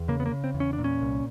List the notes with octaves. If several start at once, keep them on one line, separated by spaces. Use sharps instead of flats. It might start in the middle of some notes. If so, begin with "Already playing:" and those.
Already playing: E2
C#3 A#3
B3
A#3
C#3
C4
E2
C#4
D4
A#2
C#4
C2